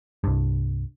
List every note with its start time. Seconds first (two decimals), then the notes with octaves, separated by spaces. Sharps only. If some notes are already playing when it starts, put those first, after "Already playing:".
0.24 C2 G2